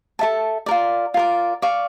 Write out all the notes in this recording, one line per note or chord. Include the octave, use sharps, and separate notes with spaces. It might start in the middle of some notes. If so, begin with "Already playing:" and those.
A4 E5 A5
F4 A#4 D5
F4 A#4 D5
D5 F5 C#6